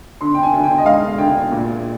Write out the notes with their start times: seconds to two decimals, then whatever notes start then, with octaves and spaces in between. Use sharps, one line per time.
0.21 D3 C6
0.34 G5
0.43 G#5
0.53 D2
0.64 G5
0.78 D#5
0.85 G#3 F5
1.18 D2 G5
1.51 A#2